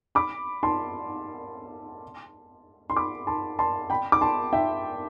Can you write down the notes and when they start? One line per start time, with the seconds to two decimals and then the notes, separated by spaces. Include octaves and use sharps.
0.15 B5 D6
0.63 A5 C6
2.90 C6
2.97 B5 D6
3.27 A5 C6
3.59 A5 C6
3.90 G5 B5
4.12 D6
4.21 A5 C6
4.53 E5 G5